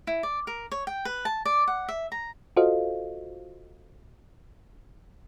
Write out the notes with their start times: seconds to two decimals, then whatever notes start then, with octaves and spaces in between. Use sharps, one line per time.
0.07 E4
0.23 D5
0.47 A#4
0.72 C#5
0.87 G5
1.05 B4
1.25 A5
1.45 D5
1.68 F#5
1.89 E5
2.12 A#5
2.56 F4 F#4 A4 C5 D#5 F5